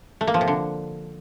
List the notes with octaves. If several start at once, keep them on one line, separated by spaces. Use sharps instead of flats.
A3
A#3
F3
C3
D3